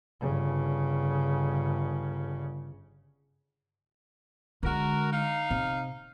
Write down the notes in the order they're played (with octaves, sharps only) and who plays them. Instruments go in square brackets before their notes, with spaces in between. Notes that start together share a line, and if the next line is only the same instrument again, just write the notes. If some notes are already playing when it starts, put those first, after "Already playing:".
[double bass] G1 C#3
[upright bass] D3 G#3 [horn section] F#4 A#4
[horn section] D#4 F5
[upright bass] C3